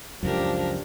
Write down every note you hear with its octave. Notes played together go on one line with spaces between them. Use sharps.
C#2 F#2 F3 D4 G4 A#4